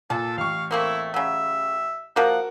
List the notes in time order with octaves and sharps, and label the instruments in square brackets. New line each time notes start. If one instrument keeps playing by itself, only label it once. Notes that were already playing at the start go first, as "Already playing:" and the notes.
[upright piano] A#2 [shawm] A4 [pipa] A5
[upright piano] A1 C#6 [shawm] F5
[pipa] A3 A#3 C4 [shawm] E4
[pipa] C#3 F#3 [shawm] E5
[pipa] F3 A#3 [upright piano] F#4 A#4 A5 [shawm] F#5